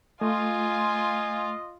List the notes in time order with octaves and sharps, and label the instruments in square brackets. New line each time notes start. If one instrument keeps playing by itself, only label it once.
[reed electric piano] A3 [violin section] F4 [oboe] D#5 [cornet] G#5